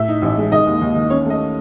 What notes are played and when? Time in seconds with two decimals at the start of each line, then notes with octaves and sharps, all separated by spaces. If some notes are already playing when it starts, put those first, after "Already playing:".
Already playing: A2 E5
0.08 D#4
0.22 A1
0.37 G#3
0.52 D#3 D#5
0.66 D#2
0.81 D#2
0.96 D#3
1.10 C#4 C#5
1.26 A3 D#5